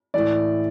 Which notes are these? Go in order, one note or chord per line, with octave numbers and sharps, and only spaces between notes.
A2 E3 D5